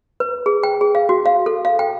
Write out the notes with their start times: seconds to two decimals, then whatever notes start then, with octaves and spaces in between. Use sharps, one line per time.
0.20 B4
0.46 G#4
0.63 G5
0.81 G#4
0.95 F5
1.09 F#4
1.26 F5
1.46 A4
1.65 F5
1.79 G5